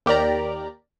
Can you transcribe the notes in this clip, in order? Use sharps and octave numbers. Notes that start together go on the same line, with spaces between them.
D#2 G4 A#4 D5 A#5